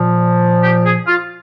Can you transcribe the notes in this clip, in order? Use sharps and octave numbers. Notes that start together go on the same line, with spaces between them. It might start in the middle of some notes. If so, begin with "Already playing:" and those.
Already playing: A#2 F3
G4
G#4
F4